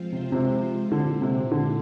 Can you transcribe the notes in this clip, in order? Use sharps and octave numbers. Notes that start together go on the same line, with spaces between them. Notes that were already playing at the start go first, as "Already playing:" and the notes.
Already playing: F3 G#3 C4 F4 C5
C3
C3
A#2 D3 G#3 C4
C3
D3